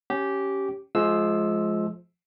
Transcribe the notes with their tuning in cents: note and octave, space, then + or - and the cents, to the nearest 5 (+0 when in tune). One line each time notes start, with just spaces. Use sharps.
C#4 +0 G4 -10 C#5 +0
F3 +0 G#3 +25 E6 +0